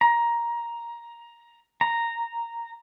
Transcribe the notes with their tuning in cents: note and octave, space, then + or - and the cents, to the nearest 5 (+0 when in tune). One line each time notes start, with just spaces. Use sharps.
A#5 +10
A#5 -5